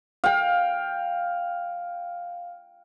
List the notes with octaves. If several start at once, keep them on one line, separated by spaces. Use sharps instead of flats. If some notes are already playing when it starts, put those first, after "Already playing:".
F5 G5